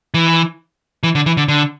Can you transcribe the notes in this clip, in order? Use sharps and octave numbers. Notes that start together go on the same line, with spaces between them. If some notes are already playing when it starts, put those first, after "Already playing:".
E3
E3
D3
E3
D3
D3